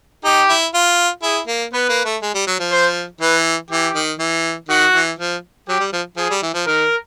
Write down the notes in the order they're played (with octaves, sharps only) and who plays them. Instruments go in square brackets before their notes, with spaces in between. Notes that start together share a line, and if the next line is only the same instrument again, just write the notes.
[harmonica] D#4 [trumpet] G4
[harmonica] E4
F4
[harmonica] E4 [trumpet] G#4
[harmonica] A#3
[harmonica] B3 [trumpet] B4
[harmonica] A#3
A3
G#3
G3
F#3
F3
[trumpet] C5
[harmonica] E3 [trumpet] B4
[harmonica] E3 [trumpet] G4
[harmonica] D#3
E3
[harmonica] D#3 [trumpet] F#4
[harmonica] E3
F3
[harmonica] F#3 [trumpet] G4
[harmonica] G3
F3
[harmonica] F3 [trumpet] G#4
[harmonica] G3
E3
F3
[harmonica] D#3 [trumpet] A#4